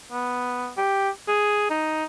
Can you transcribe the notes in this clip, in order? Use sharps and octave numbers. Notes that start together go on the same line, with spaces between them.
B3
G4
G#4
D#4